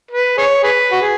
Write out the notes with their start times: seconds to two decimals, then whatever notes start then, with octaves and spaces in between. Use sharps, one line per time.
0.11 B4
0.37 G#4 C#5
0.63 G#4 B4
0.92 F#4
1.02 G#4